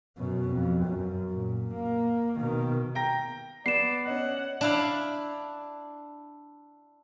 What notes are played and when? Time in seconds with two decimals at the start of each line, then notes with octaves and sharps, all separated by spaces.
0.17 F#2 B2
0.50 F2
0.85 F#2
1.30 A#2
1.74 A#3
2.40 B2 D#3
2.95 G5 A#5 A#6
3.66 B3 D5 C7 E7
4.06 C#4 D#5 F#5
4.61 D4 E4 F5